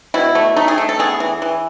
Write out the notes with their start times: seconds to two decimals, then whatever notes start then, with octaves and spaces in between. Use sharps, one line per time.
0.14 B2 E4
0.35 A3
0.56 A3 D#4
0.68 G#4
0.78 A3
0.89 A4
0.99 B3 G#4
1.20 E3
1.42 E3